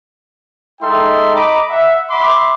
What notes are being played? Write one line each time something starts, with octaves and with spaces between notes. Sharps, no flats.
G#3 D#4 A4 E5 G5 C6
D#5 A#5 B5 D6
E5 F#5
E5 F#5 B5 C6 D6